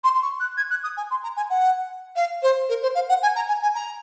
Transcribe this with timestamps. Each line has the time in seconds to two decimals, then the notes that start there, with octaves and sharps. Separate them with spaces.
0.04 C6
0.14 C6
0.22 C#6
0.40 F#6
0.57 G#6
0.70 F#6
0.83 D#6
0.97 G#5
1.11 C6
1.23 A#5
1.37 G#5
1.50 F#5
2.16 F5
2.43 C5
2.69 A#4
2.82 C5
2.95 F5
3.09 F#5
3.22 G#5
3.35 A#5
3.48 G#5
3.62 G#5
3.75 A#5